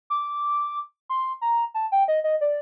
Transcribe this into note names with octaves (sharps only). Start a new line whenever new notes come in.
D6
C6
A#5
A5
G5
D#5
D#5
D5